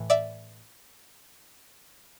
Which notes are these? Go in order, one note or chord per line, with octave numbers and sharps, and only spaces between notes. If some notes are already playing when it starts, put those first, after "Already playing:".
Already playing: A2 E3
D5 E5